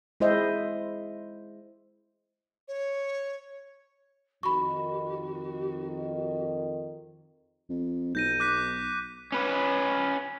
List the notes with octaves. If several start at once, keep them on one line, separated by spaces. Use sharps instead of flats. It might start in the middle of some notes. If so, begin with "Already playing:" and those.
G#3 E4 C5 D#5 E5
C#5
F2 D#3 F#4 B5 C#6
F2
B1 G6 A#6 D#7
D6 F#6 B6
C#4 B4